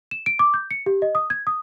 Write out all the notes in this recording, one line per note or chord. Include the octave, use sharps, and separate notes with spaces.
E7
D7
D6
G6
C#7
G4
D#5
D#6
G#6
D#6